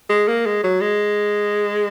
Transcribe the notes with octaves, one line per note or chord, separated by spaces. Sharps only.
G#3
A#3
G#3
F#3
G#3